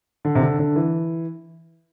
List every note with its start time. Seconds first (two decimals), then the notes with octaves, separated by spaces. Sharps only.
0.25 D3
0.35 C3
0.41 D3
0.59 D3
0.76 E3